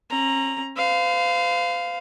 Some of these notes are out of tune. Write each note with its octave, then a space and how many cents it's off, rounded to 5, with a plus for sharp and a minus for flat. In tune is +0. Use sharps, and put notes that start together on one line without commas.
C#4 -45 A#5 +0
C5 -45 F5 +0